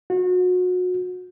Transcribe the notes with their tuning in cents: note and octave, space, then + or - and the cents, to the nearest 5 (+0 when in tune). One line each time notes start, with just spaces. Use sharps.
F#4 -30